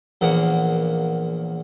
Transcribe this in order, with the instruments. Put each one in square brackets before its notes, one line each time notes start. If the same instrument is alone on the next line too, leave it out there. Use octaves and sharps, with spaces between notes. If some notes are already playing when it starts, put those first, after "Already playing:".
[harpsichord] A#1 E2 A#3 F#5